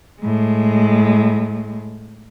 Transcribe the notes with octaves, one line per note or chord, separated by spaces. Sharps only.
A2 G#3